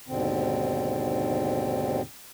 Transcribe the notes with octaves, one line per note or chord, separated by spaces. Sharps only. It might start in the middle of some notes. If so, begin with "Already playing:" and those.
D#2 G#2 B2 D3 C4